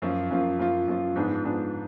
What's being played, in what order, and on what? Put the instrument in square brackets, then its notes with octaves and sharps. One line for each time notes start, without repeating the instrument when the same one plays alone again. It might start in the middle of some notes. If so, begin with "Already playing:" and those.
[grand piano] F#2 F3 A#3 F4
F#2 F3 A#3 F4
F#2 F3 A#3 F4
F#2 F3 A#3 F4
G#2 F3 B3 D4 G#4
G#2 F3 B3 D4 G#4